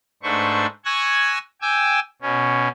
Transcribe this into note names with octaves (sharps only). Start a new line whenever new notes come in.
G#2 A3 D4 B4 C5 C#6
G#5 C#6 E6 F#6 G#6 A#6
G5 G#5 D6 E6
B2 C#4